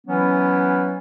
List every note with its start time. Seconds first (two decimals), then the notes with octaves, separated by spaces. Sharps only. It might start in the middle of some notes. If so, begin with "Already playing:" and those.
0.07 E3 F#3 B3 C#4 E4